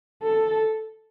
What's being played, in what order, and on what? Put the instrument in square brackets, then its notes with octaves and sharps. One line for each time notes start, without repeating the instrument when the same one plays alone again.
[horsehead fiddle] A4